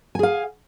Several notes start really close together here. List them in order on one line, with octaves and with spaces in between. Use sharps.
G#5 G#4 F5